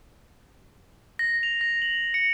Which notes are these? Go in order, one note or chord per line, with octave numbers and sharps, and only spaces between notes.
A#6
F7
A#6
F#7
C#7